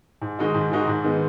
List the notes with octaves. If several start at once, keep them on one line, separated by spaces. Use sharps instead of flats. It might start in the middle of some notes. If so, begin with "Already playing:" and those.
G#2
D#3 G#3 D#4 F#4
G#2
D#3 G#3 D#4 F#4
G#2
D#3 G#3 B3